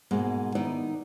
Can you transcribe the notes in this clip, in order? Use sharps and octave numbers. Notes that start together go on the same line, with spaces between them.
G#2 B2 G#3 A#3
D#3 B3 D#4 E4 D5